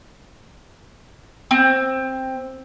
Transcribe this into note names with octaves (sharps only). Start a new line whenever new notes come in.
C4